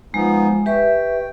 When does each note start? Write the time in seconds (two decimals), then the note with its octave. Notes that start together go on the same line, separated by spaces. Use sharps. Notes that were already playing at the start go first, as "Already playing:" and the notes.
0.14 F3 G#3 B3 D#4
0.66 G4 B4 E5 G5 C#6